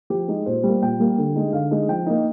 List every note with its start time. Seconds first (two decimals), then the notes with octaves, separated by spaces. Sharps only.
0.10 F3 G4
0.28 G#3 D#4
0.46 A#2 C5
0.63 G3
0.69 A#3
0.82 A#2 G5
1.00 G3 A#3
1.18 D3
1.36 G#3 D#4
1.53 D3 F5
1.71 G#3 D#4
1.88 F3 G5
2.06 A#3 D#4